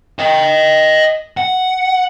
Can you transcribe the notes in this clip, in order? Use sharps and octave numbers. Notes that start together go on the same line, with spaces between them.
D#5 G5
F#5